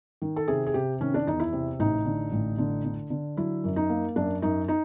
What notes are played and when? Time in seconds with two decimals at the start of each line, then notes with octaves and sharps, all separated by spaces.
0.22 D#3
0.36 A4
0.48 C3 G#4
0.67 G#4
0.74 C3 G4
1.01 D#3 C#4
1.14 D4
1.26 E2 D#4
1.40 E4
1.53 C3
1.79 A1 D#4
2.05 D3
2.32 A1
2.58 D3
2.84 D3
3.10 D3
3.37 F#3 E4
3.64 F#2
3.76 D#4
3.89 A#3
4.16 F#2 D4
4.42 F#2 D#4
4.68 D#4